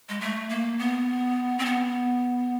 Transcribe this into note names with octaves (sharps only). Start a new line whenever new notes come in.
G#3
A3
A#3
B3
C4
B3